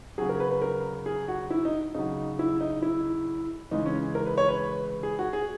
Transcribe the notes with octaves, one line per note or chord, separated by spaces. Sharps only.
C#3 F#3 G#4
A#4
B4
B4
A#4
G#4
F#4
E4
D#4
C#3 F#3 D#4
E4
D#4
E4
C#3 E3 G#3 D#4
C#4
A#4
B4
C#5
B4
G#4
F#4
G#4